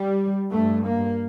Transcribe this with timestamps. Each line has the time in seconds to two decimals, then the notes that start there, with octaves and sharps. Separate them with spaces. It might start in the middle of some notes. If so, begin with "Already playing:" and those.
Already playing: G3
0.51 G2 A3
0.86 A#3